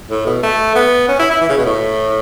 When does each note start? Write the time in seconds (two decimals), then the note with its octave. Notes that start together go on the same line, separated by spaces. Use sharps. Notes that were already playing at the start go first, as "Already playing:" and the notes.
0.10 A2
0.26 B2
0.43 A3
0.75 B3
1.08 C#4
1.19 E4
1.30 E4
1.41 E3
1.49 C#3
1.57 B2
1.66 A2